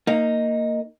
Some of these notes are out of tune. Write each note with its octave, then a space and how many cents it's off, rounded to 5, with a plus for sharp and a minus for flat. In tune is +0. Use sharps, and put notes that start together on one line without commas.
A#3 -15 D#4 +0